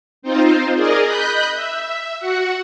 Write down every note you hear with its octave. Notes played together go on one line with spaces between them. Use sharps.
C4 D#4 F4 C5
G#4 A#4 D5 D#5
D#5 B5 F#6 G6
E5
F#4 F#5